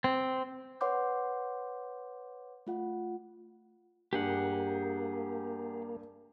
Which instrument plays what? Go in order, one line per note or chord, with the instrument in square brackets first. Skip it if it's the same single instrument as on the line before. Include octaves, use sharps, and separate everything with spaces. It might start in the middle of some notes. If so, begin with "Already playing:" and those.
[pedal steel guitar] C4
[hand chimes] B4 C#5 F#5 C6 D6 G6
A3 F4 F#5
[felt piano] G2 [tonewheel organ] A#3 [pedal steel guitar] G4 G#4 F#5